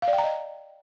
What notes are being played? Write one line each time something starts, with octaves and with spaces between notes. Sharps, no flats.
F5
D5
G5
A#5
D#5